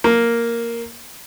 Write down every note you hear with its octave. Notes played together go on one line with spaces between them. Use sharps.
A#3